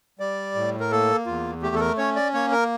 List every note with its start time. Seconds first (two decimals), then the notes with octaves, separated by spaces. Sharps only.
0.19 G3 D5
0.55 A2
0.80 A#4
0.91 A#3 A4
1.26 E2 F4
1.62 A3 G4
1.75 A4
1.80 A#4
1.97 C#4 C#5
2.16 D5
2.34 A#3 C#5
2.52 A#4